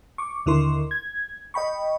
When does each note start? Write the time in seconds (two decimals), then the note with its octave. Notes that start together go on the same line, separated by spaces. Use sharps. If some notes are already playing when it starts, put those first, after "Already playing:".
0.18 C#6 D6
0.46 D#2 D3 E4 A#4 C6 C#6
0.91 G#6
1.54 D#5 G5 B5 C#6